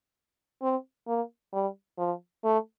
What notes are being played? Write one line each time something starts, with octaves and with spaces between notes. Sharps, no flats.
C4
A#3
G3
F3
A3